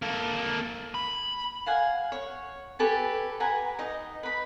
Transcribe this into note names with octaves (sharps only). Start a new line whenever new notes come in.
A#3 A4
B5
F5 F#5 G#5
C#5
G4 A4 B4 G#5
B4 F#5 G#5 A#5
D#4 D#5
B4 B5